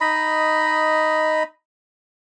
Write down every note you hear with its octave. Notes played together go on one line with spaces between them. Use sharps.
D#4 D#5 B5